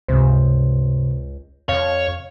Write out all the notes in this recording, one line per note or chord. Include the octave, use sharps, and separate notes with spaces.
C#2 G2 C3 C5
F2 C#5 F5